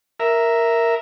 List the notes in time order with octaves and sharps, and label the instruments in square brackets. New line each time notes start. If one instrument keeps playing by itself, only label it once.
[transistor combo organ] A#4 E5